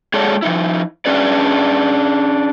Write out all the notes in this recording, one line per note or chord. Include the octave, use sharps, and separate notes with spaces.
G#3 G#4 A4 C#5 D5
F3 G#3 D#4 E4
C#4 D4 G#4 B4 D5